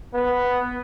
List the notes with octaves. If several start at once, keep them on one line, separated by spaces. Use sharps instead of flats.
B3